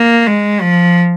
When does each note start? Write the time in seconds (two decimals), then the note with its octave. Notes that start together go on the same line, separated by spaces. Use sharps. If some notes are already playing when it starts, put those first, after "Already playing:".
Already playing: A#3
0.26 G#3
0.61 F3